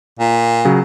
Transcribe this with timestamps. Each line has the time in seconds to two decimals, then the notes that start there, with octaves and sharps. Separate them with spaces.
0.19 A#2
0.65 C#3 F#3